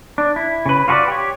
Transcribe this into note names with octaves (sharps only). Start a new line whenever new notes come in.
D4
E4
C#3 B4
F4 F#4 G#4 B4 D5
G4 C#5